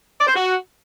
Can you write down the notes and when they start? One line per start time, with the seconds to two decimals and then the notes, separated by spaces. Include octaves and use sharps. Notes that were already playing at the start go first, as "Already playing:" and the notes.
0.18 D5
0.27 C5
0.35 F#4